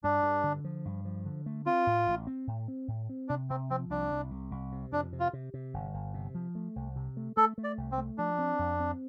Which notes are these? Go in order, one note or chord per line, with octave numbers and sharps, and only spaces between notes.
G2 D4
G2
D3
F3
G2
F3
D3
A3
C4 F4
A2
A1
C4
A2
C4
A2
C4
C3 D4
C3 C4
F3 C4
C2 D4
C2
C2
C2
C3
F2 D4
C3
F4
C3
C3
G1
G1
C3
F3
A3
C2
C3
A3
A3 A4
A3
D5
C2
C4
A3
F3 D4
C4
F2
C4